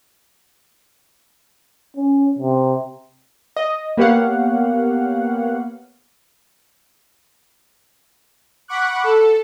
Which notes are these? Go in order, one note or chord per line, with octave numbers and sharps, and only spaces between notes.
C#4
C3
D#5
A#3 B3 G4 C#5 F5 F#5
F#5 B5 C#6 D6 F#6
A4